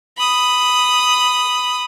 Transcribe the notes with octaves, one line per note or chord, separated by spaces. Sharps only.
B5 D#6